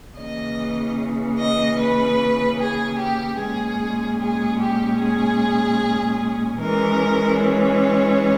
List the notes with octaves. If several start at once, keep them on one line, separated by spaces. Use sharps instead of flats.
C#3 E3 A#3 C#4 D#5
D#5
B4
G#4
G4
A#2 G#3 C#4 G#4
G#4
G4
G#4
E3 G#3 C#4 A#4
C#5